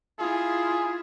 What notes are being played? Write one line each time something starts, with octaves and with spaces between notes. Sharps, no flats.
E4 F4 G#4